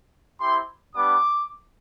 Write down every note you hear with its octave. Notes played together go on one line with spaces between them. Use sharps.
C4 E4 G4 C6
G3 B3 D4 D6